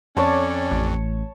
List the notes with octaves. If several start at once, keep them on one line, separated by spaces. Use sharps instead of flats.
F2 C#4 C#5 D5 A5
A1